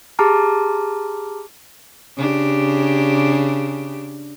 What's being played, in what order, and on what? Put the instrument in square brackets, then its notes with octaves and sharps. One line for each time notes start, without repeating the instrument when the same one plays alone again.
[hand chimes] G4 G#4 A5 A#5 D6 F6
[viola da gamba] C#3 D4 G4